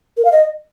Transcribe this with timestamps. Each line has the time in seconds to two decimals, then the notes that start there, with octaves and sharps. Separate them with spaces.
0.17 A#4
0.25 F5
0.32 D#5